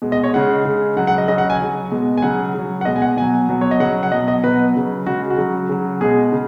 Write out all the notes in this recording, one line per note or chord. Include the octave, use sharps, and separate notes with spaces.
B2 G#3
D#5
C#5
C#3 G#3 F#5
C#3 G#3
C#3 F#3 F#5
F#5
D#5
C#3 F#3 D#5
F#5
G#5
C#3 F#3
B2 G#3
G#5
C#3 F#3 F#5
C#3 F#3
F#5
B2 G#3 D#5
G#5
F#5
B2 F#3 G#5
B2 F#3
C#5
D#5
C#3 F#3 F#5
F#5
B2 F#3 D#5
D#5
B2 F#3 B4
C#3 F#3
C#3 G#3 F#4
F#4
C#3 F#3
C#3 F#3
B2 G#3 G#4
C#3